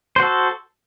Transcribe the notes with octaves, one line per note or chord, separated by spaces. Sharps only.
F#4 A4 C5